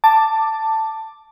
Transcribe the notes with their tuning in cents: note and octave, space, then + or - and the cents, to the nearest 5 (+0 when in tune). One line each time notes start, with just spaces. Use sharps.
A5 +10 D6 +5